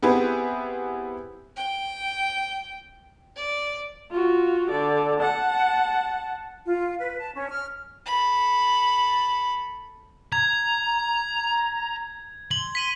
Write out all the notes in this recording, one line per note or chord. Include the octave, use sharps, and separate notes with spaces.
B3 C4 E4 G4 G#4 B4
G5
D5
F4 F#4
D3 D5
F#5 A5
F4
B4
A5
C#4
F6
A4 B5
A#5 G#6
C6 F#7
B6 D#7 F#7